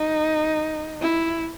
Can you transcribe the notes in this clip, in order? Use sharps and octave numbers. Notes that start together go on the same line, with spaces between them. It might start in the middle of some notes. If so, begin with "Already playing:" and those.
Already playing: D#4
E4